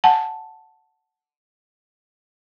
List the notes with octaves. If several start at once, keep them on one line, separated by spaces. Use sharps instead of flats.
F#5 G#5 A5